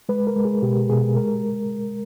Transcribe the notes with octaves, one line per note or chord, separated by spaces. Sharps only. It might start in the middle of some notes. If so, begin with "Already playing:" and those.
G#3 B4
A#4
G#3
G#4
B2 G4
B2 G#4
G#3 A#4